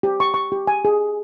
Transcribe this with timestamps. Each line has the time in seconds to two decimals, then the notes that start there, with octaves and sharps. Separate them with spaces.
0.03 G4
0.20 C#6
0.34 C#6
0.52 G4
0.67 G#5
0.85 G#4